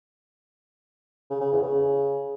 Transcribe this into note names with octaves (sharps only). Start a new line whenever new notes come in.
C#3
C#3
E2
C#3